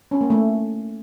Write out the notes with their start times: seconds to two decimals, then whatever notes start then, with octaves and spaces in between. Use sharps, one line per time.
0.11 C#4
0.21 A#3
0.30 A3